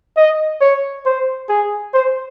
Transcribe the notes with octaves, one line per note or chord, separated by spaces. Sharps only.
D#5
C#5
C5
G#4
C5